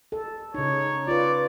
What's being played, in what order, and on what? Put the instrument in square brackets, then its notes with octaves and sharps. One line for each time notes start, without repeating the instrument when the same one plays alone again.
[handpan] A4
[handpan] C#3 D#4 [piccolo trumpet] C#5
[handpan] F4 B4 [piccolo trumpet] D5